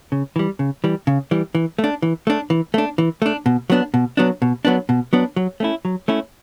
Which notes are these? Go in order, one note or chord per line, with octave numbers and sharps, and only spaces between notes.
C#3
E3 G3
C#3
E3 G3
C#3
E3 G3
E3
A3
D4
E3
A3 D4
E3
A3 D4
E3
A3 D4
B2
F#3 B3 D4
B2
F#3 B3 D4
B2
F#3 B3 D4
B2
F#3 B3 D4
F#3
A3 C#4 E4
F#3
A3 C#4 E4